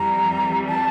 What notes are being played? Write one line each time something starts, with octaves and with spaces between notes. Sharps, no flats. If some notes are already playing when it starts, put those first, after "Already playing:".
Already playing: F2 E3 G3 A#5
A5